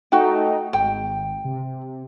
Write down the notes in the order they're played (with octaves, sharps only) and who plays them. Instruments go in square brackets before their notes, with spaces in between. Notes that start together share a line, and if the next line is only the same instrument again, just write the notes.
[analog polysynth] A3 D#4 [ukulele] F#4 G5
[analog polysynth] G#1 [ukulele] G5
[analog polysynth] C3